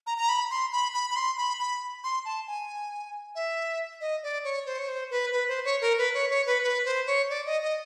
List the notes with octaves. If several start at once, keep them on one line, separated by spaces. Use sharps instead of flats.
A#5
A#5
B5
C6
B5
B5
B5
C6
B5
B5
C6
A5
G#5
E5
D#5
D5
C#5
C5
C#5
C5
B4
B4
C5
C#5
A#4
B4
C#5
C#5
B4
B4
C5
C#5
D5
D#5
D#5